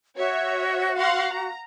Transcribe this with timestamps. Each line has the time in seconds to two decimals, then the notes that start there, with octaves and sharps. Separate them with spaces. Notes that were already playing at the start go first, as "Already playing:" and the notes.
0.17 F#4 C#5 E5
0.95 F5 F#5 C6
1.31 A#5